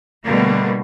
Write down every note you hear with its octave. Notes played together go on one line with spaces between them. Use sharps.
B2 D3 G3 A3 A#3